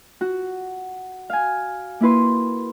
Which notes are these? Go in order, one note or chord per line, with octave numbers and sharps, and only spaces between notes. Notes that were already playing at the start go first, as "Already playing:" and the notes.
F#4
F5 G#5
A#3 E4 B4 C6